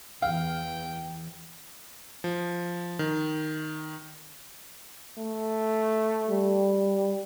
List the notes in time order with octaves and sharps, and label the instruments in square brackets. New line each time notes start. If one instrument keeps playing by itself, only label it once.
[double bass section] E2 E3 [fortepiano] F5 [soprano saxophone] G5
[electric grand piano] F3
D#3
[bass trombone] A3
[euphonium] G3